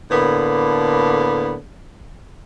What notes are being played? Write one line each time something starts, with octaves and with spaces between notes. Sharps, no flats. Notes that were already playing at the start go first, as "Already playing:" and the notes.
A2 D3 A#3 B3